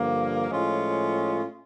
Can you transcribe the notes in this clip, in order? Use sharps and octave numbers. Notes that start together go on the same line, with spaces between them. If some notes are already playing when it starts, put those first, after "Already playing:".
Already playing: G2 D3 F3 A#3
A2 F3 G#3 C#4 F4